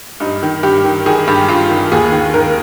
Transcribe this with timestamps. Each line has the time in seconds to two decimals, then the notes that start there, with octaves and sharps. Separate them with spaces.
0.20 G2 D#4
0.43 D#3
0.63 G2 G4
0.84 D#3
1.06 D#3 G#4
1.27 G2 G4
1.49 G2 F4
1.70 D#3
1.92 D#2 G#4
2.12 D#3
2.34 D#3 A#4